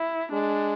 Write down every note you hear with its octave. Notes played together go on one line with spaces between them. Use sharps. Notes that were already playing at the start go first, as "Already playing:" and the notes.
Already playing: E4
G#3 D4